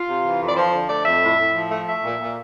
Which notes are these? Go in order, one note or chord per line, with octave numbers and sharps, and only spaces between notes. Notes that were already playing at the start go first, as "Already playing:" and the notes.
Already playing: F4
C3
E3
F2
D5
F3 C5
D3
A3 D5
F2 E5
A2
A2
F3
A3
A3 E5
A#2
A#2